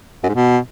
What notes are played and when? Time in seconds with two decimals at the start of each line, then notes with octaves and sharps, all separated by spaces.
0.24 F#2
0.29 G#2
0.35 B2